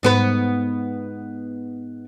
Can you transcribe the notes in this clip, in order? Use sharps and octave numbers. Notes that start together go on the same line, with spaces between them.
G#2 B3 B4